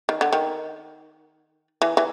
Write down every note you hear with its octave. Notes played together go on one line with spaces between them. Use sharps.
D#3
D3
D#3
E3
E3